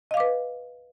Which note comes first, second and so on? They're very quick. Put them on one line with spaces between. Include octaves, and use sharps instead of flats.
D#5 F5 D6 B4